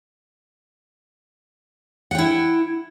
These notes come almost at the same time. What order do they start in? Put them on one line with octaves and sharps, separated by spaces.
F#5 G5 E4